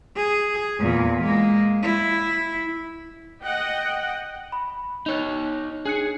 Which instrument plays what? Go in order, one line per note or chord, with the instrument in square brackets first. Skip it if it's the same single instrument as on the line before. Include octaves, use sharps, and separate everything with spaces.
[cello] G#4
E2 A#2
G#3 A#3
E4
[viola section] D#5 F#5 G5
[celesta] B5
[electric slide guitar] D#4 C#5 [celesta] F#6 F7
[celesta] D4 F#6 C#7 [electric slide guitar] G#4